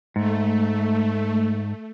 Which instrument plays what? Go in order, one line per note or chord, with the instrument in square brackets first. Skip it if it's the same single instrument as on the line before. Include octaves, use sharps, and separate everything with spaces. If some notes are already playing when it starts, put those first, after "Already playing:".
[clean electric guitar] G#2 [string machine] A3